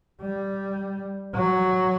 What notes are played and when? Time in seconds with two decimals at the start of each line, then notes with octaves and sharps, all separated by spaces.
0.22 G3
1.35 F#3